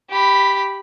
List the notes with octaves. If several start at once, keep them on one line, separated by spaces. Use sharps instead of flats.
G4 B5